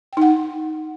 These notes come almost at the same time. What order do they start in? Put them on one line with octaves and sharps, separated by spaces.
G5 D#4 F#5